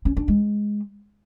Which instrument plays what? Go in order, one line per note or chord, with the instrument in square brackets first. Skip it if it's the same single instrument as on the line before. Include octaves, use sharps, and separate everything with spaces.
[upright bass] C#4
D4
G#3